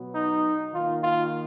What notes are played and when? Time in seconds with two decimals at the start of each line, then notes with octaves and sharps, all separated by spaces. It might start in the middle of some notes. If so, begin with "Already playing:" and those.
Already playing: B2 F#3 B3
0.13 D#4
0.73 D#3 A#3 F4
1.04 F4